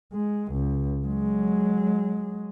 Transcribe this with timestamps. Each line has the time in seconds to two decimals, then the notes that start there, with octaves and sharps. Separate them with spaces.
0.13 G#3
0.53 C#2
1.06 F#3 G#3